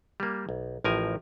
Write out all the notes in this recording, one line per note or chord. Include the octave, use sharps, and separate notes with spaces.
G3 A#3
B1
A1 A2 F3 A#4 G#5